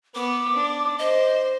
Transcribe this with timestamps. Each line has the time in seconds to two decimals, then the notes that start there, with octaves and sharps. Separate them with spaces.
0.15 B3 D6
0.56 D4
0.99 C5 D#5